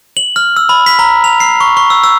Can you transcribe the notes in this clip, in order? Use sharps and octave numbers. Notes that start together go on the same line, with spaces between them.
F#7
F6
E6
B5
B6
A#5
F7
C7
C#6
C#6
E6
E6